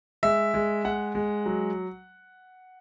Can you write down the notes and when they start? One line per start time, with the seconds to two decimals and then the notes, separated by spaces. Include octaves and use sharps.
0.23 G#3 E5
0.54 G#3
0.84 G#3 F#5
1.15 G#3
1.46 F#3